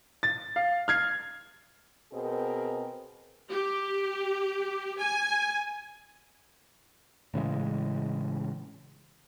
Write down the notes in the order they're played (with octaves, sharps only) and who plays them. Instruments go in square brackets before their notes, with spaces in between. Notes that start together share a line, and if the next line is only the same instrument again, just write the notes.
[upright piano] A6
F5
F6 G#6 C7
[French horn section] B2 C4 G#4 A#4
[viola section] G4
G#5
[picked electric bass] A2 C#3 E3 G#3